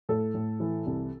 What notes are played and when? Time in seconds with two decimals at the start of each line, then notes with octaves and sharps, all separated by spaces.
0.09 A2 A4
0.34 A2
0.60 E3
0.86 C2